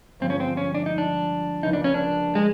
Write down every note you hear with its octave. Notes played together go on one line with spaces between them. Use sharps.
G1 G2 D3 F3 G#3 C4
C#4
C4
C#4
D4
D#4
D4
C#2 C#3 F3 A#3 D#4
D4
C#4
D4
G#3